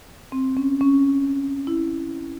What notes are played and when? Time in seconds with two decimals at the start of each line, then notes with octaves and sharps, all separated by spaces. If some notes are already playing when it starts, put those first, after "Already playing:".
0.32 C4
0.57 C#4
0.81 C#4
1.67 E4